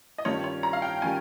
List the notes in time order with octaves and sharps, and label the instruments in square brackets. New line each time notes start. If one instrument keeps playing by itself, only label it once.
[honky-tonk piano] D#5
[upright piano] G2 D#3 G3 C#4 F4 [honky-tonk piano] C#5
[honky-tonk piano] C#5
A#5
F5
G5
[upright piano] D#3 G3 C#4 F4 [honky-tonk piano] G#5